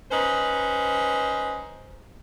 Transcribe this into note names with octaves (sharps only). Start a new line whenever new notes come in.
C#4 D#4 B4 C5